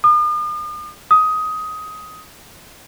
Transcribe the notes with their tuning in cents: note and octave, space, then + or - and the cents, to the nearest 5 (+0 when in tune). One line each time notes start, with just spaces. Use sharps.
D#6 -45
D#6 +15